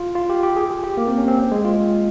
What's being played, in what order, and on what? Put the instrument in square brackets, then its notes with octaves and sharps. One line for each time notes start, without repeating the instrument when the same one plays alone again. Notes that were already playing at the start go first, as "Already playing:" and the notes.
Already playing: [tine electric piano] F4
F4
G4
G4
G#4
G4
G4
A#3
C4
C#4
C4
G#3
F4